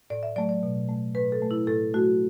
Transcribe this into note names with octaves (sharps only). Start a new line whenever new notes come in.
A2 D5
E5
F#3 A3 D5
D5
B2
A3
A2 B4
A4
A3
E4
A2 A4
F#3 A3 F#4